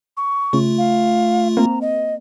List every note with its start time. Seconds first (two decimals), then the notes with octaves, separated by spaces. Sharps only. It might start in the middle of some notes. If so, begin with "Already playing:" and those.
0.17 C#6
0.53 C#3 A3 F4
0.78 F5
1.57 A#3 C4 A#5
1.81 D#5